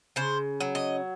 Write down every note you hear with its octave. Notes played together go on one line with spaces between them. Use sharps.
C#3 C5
F#3
D#5